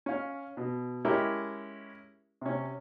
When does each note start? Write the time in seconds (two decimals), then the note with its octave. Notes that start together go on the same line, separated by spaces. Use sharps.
0.06 C#4 F5
0.57 B2
1.05 G#3 C#4 E4 G4 A#4
2.41 C3 C#4